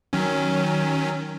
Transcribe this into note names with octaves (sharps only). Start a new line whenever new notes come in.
D#3 F#3 C#4